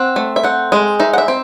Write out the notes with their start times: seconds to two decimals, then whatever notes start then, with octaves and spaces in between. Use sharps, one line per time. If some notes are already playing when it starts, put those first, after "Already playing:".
Already playing: C4 F#5
0.16 A3
0.36 E5
0.43 C4 F#5
0.72 G#3
1.00 D#4 E5
1.13 F#5
1.18 E5
1.28 C4